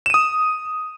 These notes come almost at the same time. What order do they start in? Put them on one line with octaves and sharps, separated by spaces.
E7 D#7 D#6